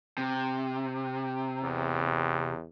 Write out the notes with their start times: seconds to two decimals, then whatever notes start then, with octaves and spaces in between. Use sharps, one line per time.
0.18 C3
1.63 E2